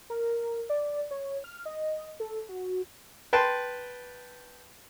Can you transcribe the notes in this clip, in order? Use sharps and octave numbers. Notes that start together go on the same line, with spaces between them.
A#4
D5
C#5
F6
D#5
A4
F#4
B4 G5 A5 C6